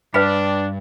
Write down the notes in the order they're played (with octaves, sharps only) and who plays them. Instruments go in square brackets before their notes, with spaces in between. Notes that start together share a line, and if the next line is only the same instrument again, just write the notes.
[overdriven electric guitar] G2 [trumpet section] D4 [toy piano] B4 F5 B5